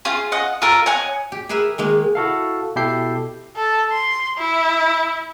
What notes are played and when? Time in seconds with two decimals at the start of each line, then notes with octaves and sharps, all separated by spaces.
0.05 C#4 F4 G#4
0.32 D#5 F#5
0.62 F4 A4 A#4
0.86 C#5 D#5 F#5 G#5
1.32 G4
1.49 G#4 A#4 B4 E5 G#5
1.78 D#3 G#3 A#3
2.15 E4 F#4 A4 F5
2.76 B2 E4 G4 A4 G6 C7
3.56 A4
3.93 C6
4.38 E4